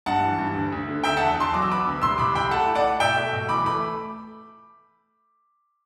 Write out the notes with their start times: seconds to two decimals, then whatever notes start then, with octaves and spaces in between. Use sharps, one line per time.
0.06 G2 F#5 A5
0.23 E3
0.38 G2
0.55 D2
0.72 D2
0.88 D3
1.04 D3 E5 G5
1.17 E2 F#5 A5
1.37 E2 A5 C6
1.53 F#3 D6
1.62 E6
1.70 B3 B5 D6
1.86 D2
2.02 C2 C6 E6
2.18 C2 B5 D6
2.35 C2 G5 B5
2.51 A3 F#5 A5
2.67 E4
2.75 D5 F#5
2.84 E4
3.00 B2 E5 G5
3.16 A3
3.33 B2
3.49 E3 B5 D6
3.65 A3 B5 D6